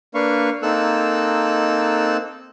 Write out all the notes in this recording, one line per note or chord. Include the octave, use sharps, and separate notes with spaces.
A#3 D4 B4 F5 C#6
A#3 C4 D#4 A4 E6 F#6